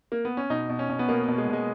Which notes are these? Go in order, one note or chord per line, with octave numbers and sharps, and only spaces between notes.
A#3
B3
C#4
B2 D#4
B2
C#4
B2
B3
B2 A#3
A#3
B2
G#3
B2 G#3